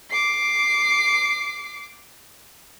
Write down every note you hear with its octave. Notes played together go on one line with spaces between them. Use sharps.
D6 C7